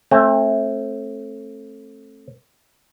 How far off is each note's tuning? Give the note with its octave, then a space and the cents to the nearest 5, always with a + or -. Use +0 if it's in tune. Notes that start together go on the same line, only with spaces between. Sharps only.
A3 +0 C4 +35